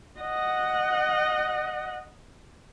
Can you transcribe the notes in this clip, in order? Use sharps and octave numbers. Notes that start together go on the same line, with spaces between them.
D#5 F#5